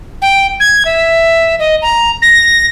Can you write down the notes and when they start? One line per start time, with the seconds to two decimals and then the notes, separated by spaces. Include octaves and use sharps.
0.22 G5
0.60 G#6
0.85 E5
1.59 D#5
1.82 A#5
2.22 A#6